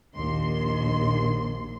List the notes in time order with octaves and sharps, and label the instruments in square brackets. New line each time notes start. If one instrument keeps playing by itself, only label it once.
[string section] A#1 D#2 C6